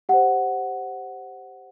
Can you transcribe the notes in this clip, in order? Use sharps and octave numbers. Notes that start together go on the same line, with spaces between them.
G4 C5 F#5